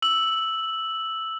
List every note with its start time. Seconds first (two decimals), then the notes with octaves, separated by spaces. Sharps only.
0.02 E6 F#7